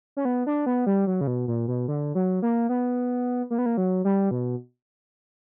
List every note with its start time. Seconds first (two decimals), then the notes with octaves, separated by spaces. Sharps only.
0.17 C#4
0.25 B3
0.47 D4
0.66 B3
0.86 G3
1.07 F#3
1.21 C#3
1.27 B2
1.48 A#2
1.68 B2
1.88 D3
2.15 F#3
2.42 A#3
2.69 B3
3.50 A#3
3.58 B3
3.66 A#3
3.77 F#3
4.05 G3
4.31 B2